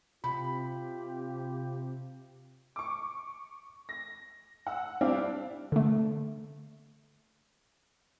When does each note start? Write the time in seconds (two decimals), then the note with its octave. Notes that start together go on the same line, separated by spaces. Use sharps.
0.24 C3 F4 G4 B5
2.76 C#6 D6
3.89 A#6
4.67 F#5 E6
5.01 G3 C4 D4 E4 F5
5.72 D3 A3